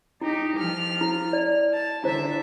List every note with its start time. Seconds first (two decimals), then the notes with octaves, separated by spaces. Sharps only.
0.21 D#4 E4 G4
0.57 F3 F6
1.01 E4
1.33 D5
1.73 A5
2.04 D3 E4 C5 E5